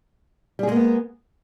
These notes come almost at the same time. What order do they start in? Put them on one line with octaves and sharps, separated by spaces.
G3 G#4 G#3 A#3 B3